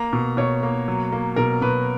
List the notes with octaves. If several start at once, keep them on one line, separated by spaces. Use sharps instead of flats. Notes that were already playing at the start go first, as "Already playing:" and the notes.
Already playing: A#3 A#5
B2
B2 C#5
A#3
F#3
A#3
B2 A#4
B2 B4